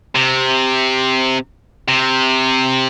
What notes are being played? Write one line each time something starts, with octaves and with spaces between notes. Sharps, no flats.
C3
C3